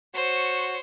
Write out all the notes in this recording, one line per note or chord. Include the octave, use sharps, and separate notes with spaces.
F#4 C5 C#5